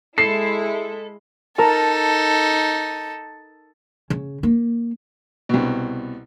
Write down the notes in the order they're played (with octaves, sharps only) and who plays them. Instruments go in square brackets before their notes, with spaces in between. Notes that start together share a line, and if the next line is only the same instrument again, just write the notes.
[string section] G#3 E4 [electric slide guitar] A4 [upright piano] C7
[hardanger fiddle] D#4 A4 [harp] A#4 A5
[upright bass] C#3
A#3
[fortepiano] C2 B2